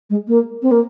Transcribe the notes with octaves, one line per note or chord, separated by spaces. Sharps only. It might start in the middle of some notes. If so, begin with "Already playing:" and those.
G#3
A#3
C4
A#3